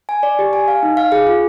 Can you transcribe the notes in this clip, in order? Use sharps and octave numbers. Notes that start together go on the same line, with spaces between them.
G#5
D5
G4
G#5
F5
D#4
F5
G#4
F4